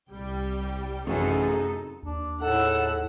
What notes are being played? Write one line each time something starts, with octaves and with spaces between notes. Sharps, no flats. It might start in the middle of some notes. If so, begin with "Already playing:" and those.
C2 G3 G5
A1 F#2 C3 D#4 G#4 A4
D#2 D4
A2 D#4 G#4 A4 F#5 E6